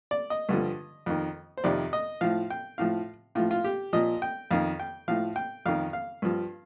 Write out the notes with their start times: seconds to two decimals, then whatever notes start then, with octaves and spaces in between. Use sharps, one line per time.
0.11 D5
0.30 D#5
0.49 G2 D3 F3
1.06 F2 D#3
1.57 C5
1.64 F2 C3 D#3 D5
1.93 D#5
2.21 A2 F3 F5
2.50 G5
2.78 A2 F3 F5
3.35 A2 F4
3.40 F3
3.51 F4
3.64 G4
3.93 A#2 F3 D#5
4.22 G5
4.51 F2 D#3 F5
4.80 G5
5.08 A2 F3 F5
5.36 G5
5.66 F2 D#3 F5
5.93 F5
6.22 G2 F3